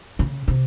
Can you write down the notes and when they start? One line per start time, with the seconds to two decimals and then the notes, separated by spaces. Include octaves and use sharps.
0.19 C#3
0.48 C3